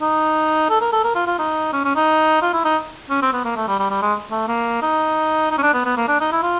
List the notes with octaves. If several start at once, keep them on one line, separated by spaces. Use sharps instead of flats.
D#4
A4
A#4
A4
A#4
F4
F4
D#4
C#4
C#4
D#4
F4
E4
D#4
C#4
C4
B3
A#3
A3
G3
G3
G3
G#3
A3
A#3
D#4
D#4
C#4
D4
B3
B3
A#3
D4
D#4
E4
F4